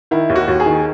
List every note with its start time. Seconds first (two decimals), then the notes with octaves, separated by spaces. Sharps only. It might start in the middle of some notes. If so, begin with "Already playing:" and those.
0.11 D#3 E4
0.29 D#2
0.36 F#4
0.48 D#2
0.60 G#4
0.66 D#3